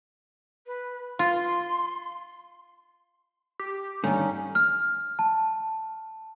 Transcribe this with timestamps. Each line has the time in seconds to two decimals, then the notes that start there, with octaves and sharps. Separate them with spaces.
0.67 B4
1.19 F4 C6
3.60 G4
4.04 G2 D3 D#3 C#4 D#4
4.55 F6
5.19 A5